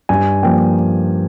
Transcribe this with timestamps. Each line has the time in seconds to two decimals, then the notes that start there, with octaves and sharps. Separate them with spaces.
0.09 G2 G#5
0.43 F3 A#3 G5